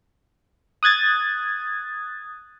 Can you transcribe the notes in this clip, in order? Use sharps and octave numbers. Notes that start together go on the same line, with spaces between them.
D#6 F#6 G#6 A6